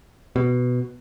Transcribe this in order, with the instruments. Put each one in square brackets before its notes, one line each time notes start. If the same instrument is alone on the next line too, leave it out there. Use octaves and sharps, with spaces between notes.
[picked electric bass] B2